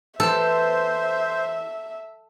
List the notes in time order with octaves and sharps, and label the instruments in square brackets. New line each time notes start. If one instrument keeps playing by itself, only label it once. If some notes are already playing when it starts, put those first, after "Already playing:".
[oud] E3 B3 G4 [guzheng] A4 [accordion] C5 [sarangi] E5